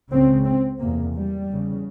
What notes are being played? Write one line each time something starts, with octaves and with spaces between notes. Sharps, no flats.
C#2 C#3 C4
C4
E2 C3 A#3
G3
E2 C#3